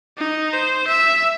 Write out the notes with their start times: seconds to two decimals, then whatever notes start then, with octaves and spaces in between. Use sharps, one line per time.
0.18 D#4
0.53 C5
0.88 E5